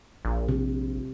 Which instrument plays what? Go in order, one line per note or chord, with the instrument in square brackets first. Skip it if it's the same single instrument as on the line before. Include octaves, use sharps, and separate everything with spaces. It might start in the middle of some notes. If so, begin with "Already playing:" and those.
[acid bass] A#1
[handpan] C3